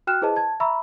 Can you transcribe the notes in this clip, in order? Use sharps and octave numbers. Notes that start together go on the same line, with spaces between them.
F#4 G5 F6 F#6 E7
E4 G#4 B4 C5 D#5 A5
A5 G#6
E5 A#5 B5 C#6 E6